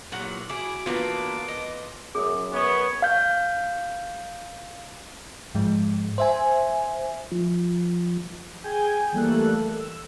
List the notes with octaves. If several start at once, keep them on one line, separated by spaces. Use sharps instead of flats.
E2 A#2 F#3 G4 F#5
E4 F#4 G#4 D6
E3 A#3 B3 D4 F4
D#5
F#2 G#4 D#6
B3 C#5
F5 G6
G#2 F3 G#3
C5 E5 G#5
F3
G#4 G5 G#5 G6
E3 G3 A3 A#3 A4 F#6
E6